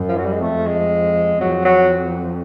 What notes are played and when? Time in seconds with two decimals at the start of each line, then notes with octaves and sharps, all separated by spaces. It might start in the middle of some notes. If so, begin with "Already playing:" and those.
Already playing: F#2
0.09 F3
0.17 F#3
0.25 G3
0.33 G#3
0.41 F2 A3
0.66 G#3
1.40 F2 F#3
1.65 F#3